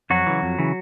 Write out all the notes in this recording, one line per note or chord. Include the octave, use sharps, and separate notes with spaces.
F2 F#3 F#4
C#3 E3
F2
C#3 E3